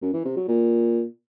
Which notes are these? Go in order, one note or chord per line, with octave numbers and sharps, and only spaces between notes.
F#2
E3
C3
F#3
A#2